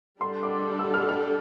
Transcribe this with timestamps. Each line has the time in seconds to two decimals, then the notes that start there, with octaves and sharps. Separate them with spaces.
0.21 G3 D4 A4 C6
0.43 D6
0.79 E6
0.94 F6
1.09 F6